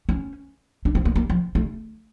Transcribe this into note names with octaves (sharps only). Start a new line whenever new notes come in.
C#4
D4
C4
A#3
A#3
F3
A3